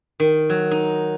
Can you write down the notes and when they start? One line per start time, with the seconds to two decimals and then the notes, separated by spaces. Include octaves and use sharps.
0.20 D#3
0.50 F#3
0.71 D#4